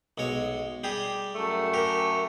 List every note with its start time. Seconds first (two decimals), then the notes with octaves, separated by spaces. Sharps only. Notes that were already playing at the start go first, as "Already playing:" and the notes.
0.18 B1 G#3 C#5
0.84 G3 G4 G#4
1.35 F#2 A3
1.74 G4 A#4